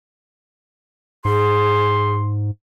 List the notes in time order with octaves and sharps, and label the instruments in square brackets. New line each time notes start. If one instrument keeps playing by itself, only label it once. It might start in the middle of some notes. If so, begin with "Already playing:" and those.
[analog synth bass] G#2 [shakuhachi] G#4 [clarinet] C6